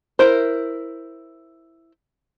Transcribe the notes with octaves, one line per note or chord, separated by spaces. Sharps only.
E4 A#4 C5